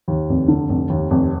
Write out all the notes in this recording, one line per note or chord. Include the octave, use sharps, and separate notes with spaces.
D#2
F1
D3
F1
D#2
F1